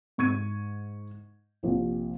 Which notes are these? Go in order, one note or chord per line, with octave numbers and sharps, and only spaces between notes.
G#2 C#6 G#6 D#7
A#1 C3